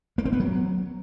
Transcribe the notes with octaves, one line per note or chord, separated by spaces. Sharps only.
A#3
C4
B3
F#3